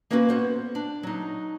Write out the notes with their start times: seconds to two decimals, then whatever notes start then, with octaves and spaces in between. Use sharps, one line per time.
0.11 A#3 B3 C#4 F#4 A4 B4
0.29 B3 C5 F#5
0.75 D4
1.03 F#3 D#4